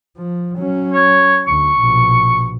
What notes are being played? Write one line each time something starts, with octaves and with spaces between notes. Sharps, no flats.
F3
F#3 C#4
C#5
D2 C#6
A#1 B2